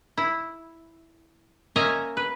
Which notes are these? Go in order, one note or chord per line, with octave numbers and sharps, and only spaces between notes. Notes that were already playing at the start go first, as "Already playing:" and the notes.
E4
A#3 C#4 D#5 E5 G#5 A#5
B4